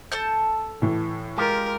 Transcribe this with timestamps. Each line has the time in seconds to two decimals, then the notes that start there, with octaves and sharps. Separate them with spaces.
0.12 A4 A5 G6
0.82 A2 E3
1.38 G#3 F4 G4 A#4